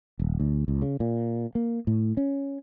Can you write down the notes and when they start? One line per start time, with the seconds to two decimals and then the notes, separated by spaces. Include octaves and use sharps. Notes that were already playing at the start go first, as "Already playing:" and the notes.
0.19 D#1
0.40 D2
0.68 C#2
0.82 C#3
1.00 A#2
1.55 A#3
1.87 A2
2.17 C#4